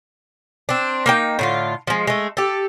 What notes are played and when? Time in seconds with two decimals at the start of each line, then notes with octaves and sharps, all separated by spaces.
0.69 C4 D4
1.06 A#3 D#4 G5
1.39 A2 D3 F4
1.87 F3 G#3
2.07 G#3 A3
2.37 G4 A4